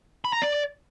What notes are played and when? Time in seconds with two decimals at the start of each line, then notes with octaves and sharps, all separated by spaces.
0.25 B5
0.33 A#5
0.42 D5